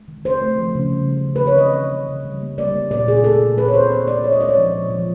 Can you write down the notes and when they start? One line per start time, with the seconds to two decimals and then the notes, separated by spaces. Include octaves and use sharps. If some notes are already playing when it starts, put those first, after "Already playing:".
Already playing: G#3
0.08 D#3
0.25 C#3 C5
0.41 A3
0.58 F3
0.75 C#3
0.92 G3
1.08 D#3
1.25 D#3
1.36 B4
1.42 D#3
1.47 C#5
1.58 E3 D#5
1.74 G3
1.92 C#3
2.08 C#3
2.25 G3
2.42 A#3
2.58 G3 D5
2.74 A#3
2.91 A#2 D5
3.07 A#2 G#4
3.24 A#2 A4
3.41 A#2
3.57 A#3 B4
3.68 C#5
3.74 D#3 C5
3.90 D#3 C5
4.07 D#3 D5
4.24 G#3 C#5
4.32 D#5
4.41 G#3 D5
4.49 C#5
4.58 F3
4.74 A#2
4.90 F3